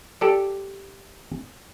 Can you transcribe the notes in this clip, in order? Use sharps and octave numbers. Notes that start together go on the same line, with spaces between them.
G4 A4 D5